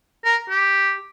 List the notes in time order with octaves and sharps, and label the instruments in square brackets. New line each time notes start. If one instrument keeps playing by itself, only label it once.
[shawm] A#4
G4